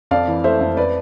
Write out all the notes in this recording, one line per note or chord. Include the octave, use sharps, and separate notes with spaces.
F2 D5 F5
E3
A3 C5 E5
F2
B4 D5